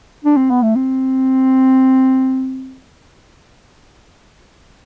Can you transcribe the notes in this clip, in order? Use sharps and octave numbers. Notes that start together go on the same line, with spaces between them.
D4
C4
B3
A3
C4